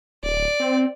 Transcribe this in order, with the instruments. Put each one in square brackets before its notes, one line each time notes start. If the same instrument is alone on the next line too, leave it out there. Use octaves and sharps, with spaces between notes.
[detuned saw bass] D1 [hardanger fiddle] D5
[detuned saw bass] C4